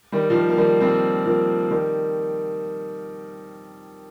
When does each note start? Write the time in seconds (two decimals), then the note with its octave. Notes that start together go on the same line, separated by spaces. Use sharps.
0.12 D#3 G3
0.30 F3
0.35 D#3
0.49 A#3
0.58 D#3 G3
0.80 G3 C4
1.25 F3 A#3
1.71 D#3 G3